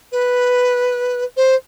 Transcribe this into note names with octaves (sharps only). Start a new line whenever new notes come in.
B4
C5